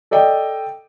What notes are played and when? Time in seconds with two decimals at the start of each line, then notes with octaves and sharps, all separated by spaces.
0.11 A4 D5 D#5 G5